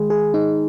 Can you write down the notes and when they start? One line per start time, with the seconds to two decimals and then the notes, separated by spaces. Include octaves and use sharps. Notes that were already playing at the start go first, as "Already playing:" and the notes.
Already playing: D#3 G#3 G#4
0.10 G#4
0.34 D#4